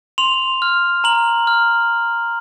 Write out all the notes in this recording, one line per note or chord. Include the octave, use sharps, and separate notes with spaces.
C6 F7
F6
A#5 F#7
F6